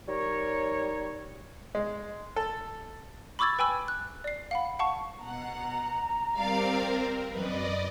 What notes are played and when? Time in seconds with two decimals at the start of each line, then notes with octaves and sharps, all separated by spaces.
0.08 G3 D#4 A#4 C#5
1.75 G#3
2.36 A4
3.39 B5 C#6 D6 E6 G#6 A6
3.59 B4 G5 G#5 B5 E6
3.88 F#6
4.24 D5 C7
4.51 F5 F#5 B5
4.79 F5 F#5 A5 C#6
5.23 B2 F#5 A#5
6.38 G3 C4 A#4 D5 F5
7.33 F#2 B4 D5 D#5